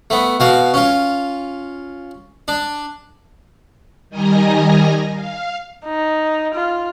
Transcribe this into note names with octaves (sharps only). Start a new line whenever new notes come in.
A3 B3
B2 F#4 F5
C#4 F4
D4
D#3 G3 D#5 G#5 A#5 A#6
F5
D#4
F4